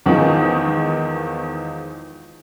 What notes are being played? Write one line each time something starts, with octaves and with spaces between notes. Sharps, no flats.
E2 D#3 F3 G#3 D#4